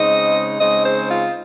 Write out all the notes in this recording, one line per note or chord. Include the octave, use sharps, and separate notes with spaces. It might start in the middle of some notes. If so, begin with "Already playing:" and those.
Already playing: C#3 G#3 C4 D#4 D#5
C#3 G#3 C4 D#4 D#5
C5
F4